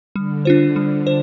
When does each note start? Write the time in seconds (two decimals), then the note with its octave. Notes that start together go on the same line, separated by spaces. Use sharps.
0.15 D3 G3
0.45 D4 F4 C5
0.76 G3
1.07 C5